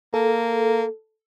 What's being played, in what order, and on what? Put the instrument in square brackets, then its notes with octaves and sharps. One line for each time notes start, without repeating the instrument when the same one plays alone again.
[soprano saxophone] A#3 [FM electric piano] A4